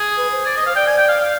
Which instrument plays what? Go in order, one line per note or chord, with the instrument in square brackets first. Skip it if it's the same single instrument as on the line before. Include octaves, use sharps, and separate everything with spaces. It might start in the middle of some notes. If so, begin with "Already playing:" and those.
Already playing: [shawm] G#4
[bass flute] B4
C5
[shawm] D5
D#5
[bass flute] C5 [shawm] F5
[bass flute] D5 [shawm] G5
[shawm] G#5
G5
F5
F5